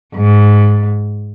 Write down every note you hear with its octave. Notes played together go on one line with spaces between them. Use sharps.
G#2